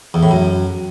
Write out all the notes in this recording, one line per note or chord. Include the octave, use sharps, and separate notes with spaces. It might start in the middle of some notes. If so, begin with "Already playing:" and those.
E2
A2
F#2